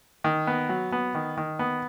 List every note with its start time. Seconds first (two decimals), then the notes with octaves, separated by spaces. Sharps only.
0.24 D#3
0.47 B3
0.69 F#3
0.92 B3
1.15 D#3
1.37 D#3
1.59 B3